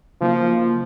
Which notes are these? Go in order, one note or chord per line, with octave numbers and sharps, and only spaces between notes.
C#3 F3 F#3 A#3 D#4